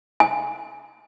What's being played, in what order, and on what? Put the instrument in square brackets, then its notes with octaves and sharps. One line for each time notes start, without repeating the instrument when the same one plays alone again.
[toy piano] G#5